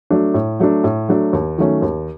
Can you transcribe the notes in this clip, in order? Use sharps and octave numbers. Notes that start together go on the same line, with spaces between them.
F#3 A3 D4
A2
F#3 A3 D4
A2
F#3 A3 D4
D#2
D#3 F#3 A3 C#4
D#2